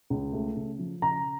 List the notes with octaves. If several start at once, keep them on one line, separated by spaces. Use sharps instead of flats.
C#2
A3
C#3
F3
C#3 A#5